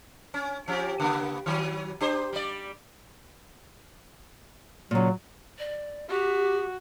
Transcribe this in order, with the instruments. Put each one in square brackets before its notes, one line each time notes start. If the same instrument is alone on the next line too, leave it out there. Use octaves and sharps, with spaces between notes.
[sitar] C#4
F3 C#4 G4
C#3 A#3 B3
D#3 F#3
D4 G4 C5
G3 D5
[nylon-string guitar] A#2 C#3 [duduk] F#3
[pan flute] D5
[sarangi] F#4 [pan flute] G4